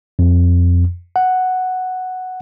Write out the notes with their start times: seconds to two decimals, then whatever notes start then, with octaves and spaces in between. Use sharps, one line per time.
0.19 F2
1.16 F#5